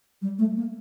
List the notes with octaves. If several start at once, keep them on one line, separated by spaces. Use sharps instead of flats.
G3
A3
A#3